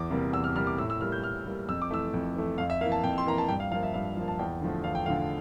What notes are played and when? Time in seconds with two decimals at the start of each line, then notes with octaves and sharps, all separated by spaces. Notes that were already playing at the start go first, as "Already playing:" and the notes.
Already playing: E2 D6
0.11 C3 G3 A#3
0.33 E2 E6
0.44 F6
0.55 C3 G3 A#3 F6
0.67 D6
0.78 A2 E6
0.90 E6
1.01 G3 A#3 F6
1.12 G6
1.23 A2 F6
1.46 G3 A#3
1.68 F2 E6
1.82 D6
1.90 E3 A3 E6
2.14 F2
2.36 E3 A3
2.58 F2 F5
2.70 E5
2.81 E3 A#3 F5
2.92 A5
3.03 F2 G5
3.18 C6
3.26 E3 A#3 A#5
3.38 A5
3.48 G2 G5
3.60 F5
3.71 F3 F5
3.75 A#3
3.83 E5
3.94 G2 F5
4.17 F3 A#3
4.28 A5
4.39 E2 G5
4.61 D3 F3 A3
4.84 E2 F5
4.95 G5
5.06 D3 F3 A3 F5